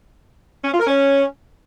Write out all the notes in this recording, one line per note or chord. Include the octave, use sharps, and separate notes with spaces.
C#4
F4
A#4
C#4